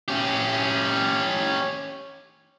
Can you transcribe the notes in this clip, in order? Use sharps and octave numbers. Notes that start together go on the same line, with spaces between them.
C#4 G4